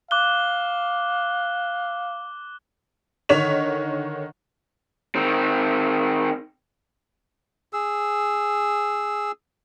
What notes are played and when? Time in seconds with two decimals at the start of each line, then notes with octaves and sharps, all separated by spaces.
0.11 F5 D6 F#6 G7
3.29 D3 D#3 C#5 B6 F7
5.15 D#3 C4
7.73 G#4 E6